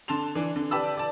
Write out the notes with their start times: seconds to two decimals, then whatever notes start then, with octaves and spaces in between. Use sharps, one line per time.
0.08 D3 A5 C6 F7
0.35 E3 D4
0.56 D3
0.71 G4 B4 D5 A5 B5 E6
0.97 D5 A5